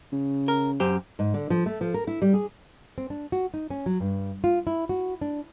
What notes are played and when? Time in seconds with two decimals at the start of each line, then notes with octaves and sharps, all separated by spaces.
0.12 C#3
0.48 A#4
0.80 F#2 G4 C5
1.19 G#2
1.34 D3
1.50 F3
1.66 A3
1.81 F3
1.94 A#4
2.07 E4
2.22 G3
2.34 G#4
2.98 C4
3.10 D4
3.32 F#4
3.54 D#4
3.70 C#4
3.86 F#3
4.00 G2
4.44 F4
4.67 E4
4.89 F#4
5.21 D4